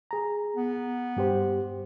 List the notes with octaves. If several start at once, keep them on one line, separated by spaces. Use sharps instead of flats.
G#4 A#5
B3
G2 G4 C5